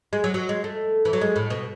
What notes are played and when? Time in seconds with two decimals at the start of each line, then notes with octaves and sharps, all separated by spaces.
0.13 G#3
0.24 F#3
0.34 F#3
0.49 G#3
0.64 A3
1.05 E3
1.13 F#3
1.21 G#3
1.36 A2
1.50 B2